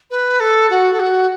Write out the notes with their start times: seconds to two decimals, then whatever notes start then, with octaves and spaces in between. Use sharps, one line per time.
0.10 B4
0.40 A4
0.70 F#4
0.93 A4
0.99 F#4